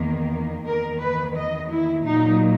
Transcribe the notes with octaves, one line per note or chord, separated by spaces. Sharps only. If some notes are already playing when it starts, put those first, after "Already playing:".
Already playing: E2 D#3 A#3
E2 D#3 A#3 A#4
B4
D#5
E4
A#2 F#3 A#3 D#4